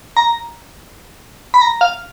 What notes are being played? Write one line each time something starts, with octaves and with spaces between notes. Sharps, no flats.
A#5
B5
A#5
F5